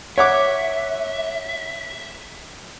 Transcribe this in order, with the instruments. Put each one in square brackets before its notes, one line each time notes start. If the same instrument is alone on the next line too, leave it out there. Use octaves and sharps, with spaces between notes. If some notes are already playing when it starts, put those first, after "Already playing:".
[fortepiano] C#5 F#5 D6 [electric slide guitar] E5